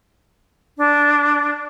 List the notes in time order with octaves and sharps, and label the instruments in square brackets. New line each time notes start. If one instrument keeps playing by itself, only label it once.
[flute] D4